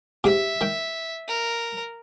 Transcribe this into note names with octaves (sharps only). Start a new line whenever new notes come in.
G#2 C3 E5 D6
D#3 C#5 G5
A#4